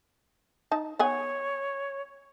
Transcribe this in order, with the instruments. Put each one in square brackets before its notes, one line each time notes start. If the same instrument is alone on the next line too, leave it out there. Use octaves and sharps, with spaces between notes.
[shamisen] D#4 A5
[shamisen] B3 F#5 G#5 [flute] C#5